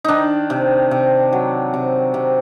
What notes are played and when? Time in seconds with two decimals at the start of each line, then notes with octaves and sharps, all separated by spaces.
0.04 D#3 D4 D#4
0.50 C3
0.91 C3
1.33 F#3
1.74 C3
2.14 C3